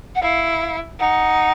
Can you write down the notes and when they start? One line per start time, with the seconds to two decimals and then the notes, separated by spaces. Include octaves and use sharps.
0.15 F#5
0.22 E4 F5
0.99 D#4 F#5